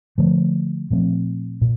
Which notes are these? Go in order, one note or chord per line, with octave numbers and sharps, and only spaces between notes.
D3 F3 A3
A#2 F3 A3 C4
A#2